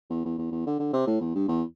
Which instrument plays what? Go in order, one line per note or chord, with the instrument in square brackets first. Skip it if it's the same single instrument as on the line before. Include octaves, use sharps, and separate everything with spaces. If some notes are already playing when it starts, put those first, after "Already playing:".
[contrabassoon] E2
E2
E2
E2
D3
D3
C3
A2
E2
G2
E2